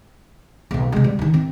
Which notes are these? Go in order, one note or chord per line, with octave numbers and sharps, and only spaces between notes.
B1 A#3
C3 G#3
G3
D#3 E3
C4